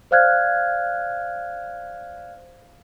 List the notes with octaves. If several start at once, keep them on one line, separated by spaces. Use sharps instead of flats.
C5 D5 F5 F6 F#6 G#6